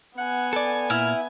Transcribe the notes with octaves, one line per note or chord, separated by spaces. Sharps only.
B3 F#5 G#5
A4 D5
A#2 E4 F6